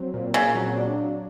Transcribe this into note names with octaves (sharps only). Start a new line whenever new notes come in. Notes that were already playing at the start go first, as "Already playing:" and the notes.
Already playing: F#3 C4
A#2
A#2 C#3
F#3
D4
F#3